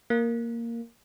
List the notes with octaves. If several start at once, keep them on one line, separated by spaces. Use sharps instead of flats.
A#3